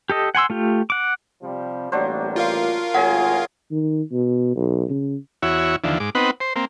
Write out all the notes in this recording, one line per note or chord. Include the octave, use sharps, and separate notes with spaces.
G4 A4 D#5
F#5 G#5 C6 E6
A3 F4 G4
F#5 D6
C3 F3 G3
A1 F#3 G3 A#3 D4 C5
F4 A#4 F5
G#1 A2 F#3 G#4 D#5 F#5 G#5
D#3
B2
B1
C#3
E2 E4 F#4 C#5
D#2 D3 E3 F3
G#2 D6
B3 C4 D#4 B4 F#5
C5
A#3 C4